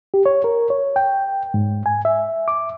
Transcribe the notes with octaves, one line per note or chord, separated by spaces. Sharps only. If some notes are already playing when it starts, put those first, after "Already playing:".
G4
C#5
A#4
C#5
G5
G#2
G#5
E5
D6